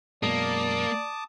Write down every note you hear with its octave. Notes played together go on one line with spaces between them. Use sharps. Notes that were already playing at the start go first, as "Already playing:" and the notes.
F#2 B2 G#3 A#3 D5 A5 D6 D#6